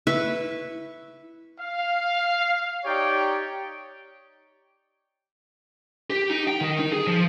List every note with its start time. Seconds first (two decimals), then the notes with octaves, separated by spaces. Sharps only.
0.07 E4 B4 E5 C#6
1.60 F5
2.85 D#4 G4 C#5 D5 G5
6.10 G4
6.30 D#4
6.47 G5
6.61 D#3
6.79 D#4
6.92 G#4
7.07 F3